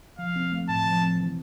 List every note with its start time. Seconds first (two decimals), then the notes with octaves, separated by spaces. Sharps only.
0.19 F3 F5
0.36 C4
0.52 A3
0.69 A2 A5
0.86 F3
1.03 C4
1.20 E3